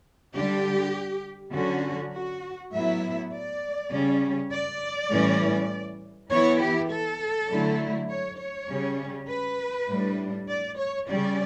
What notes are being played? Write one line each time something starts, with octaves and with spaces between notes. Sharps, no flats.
D3 G3 D4 G4
D3 F#3 C#4 F#4
F#4
A2 F#3 B3 E4 E5
D5
C#3 G3 C#4
D5
A2 E3 G3 C#4
E3 B3 E4 C#5
G4
A4
D3 F#3 A3 E4
C#5
C#5
C#3 G3 C#4
B4
A2 G3 D4
D5
C#5
C#3 G3 C#4 D5